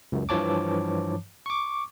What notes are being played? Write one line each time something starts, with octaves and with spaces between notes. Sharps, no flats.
C#2 F#2
G2 E3 F3 C#5 A5 D6
C#6 D6